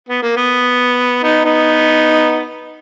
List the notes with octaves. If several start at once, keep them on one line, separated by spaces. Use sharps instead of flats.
B3
A#3
B3
B3 D#4
B3 D#4